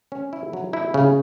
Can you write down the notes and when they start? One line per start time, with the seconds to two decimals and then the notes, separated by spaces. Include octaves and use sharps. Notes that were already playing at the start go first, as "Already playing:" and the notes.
0.12 C#4
0.33 E4
0.53 F#3
0.73 E4
0.94 C#3